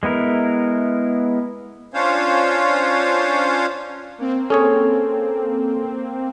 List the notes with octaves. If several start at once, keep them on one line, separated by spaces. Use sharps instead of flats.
G#3 B3 E4 A#4
C#4 D4 F4 C5 C#5 F5
A#3 C4
C#4 G#4 A4 C#5